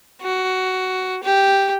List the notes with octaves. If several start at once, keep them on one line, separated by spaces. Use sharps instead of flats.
F#4
G4